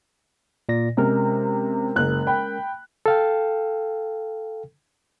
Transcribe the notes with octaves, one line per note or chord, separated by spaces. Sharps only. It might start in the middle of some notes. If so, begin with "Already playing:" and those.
A#2 D5 A#6
C3 G#3 C#4 A#4
F#1 F#6
G5 B5
A4 F5 G5